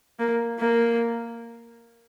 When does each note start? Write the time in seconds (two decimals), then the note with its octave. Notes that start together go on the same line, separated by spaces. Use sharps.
0.19 A#3
0.60 A#3